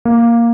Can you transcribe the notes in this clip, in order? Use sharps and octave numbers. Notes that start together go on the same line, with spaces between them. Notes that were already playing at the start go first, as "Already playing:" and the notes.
A#3